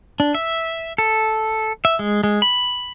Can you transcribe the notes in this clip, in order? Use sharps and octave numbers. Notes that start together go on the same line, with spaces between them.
D4
E5
A4
E5
G#3
G#3
B5